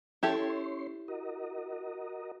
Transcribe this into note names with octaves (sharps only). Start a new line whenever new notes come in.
C#4 E4 G4 A4 C#5 C6
F#4 A#4 D#5